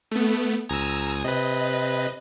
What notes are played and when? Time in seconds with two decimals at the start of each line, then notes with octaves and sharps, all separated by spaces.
0.11 A3 B3
0.69 C#2 G#5 A#5 D#6 E6
1.24 C3 B4 D#5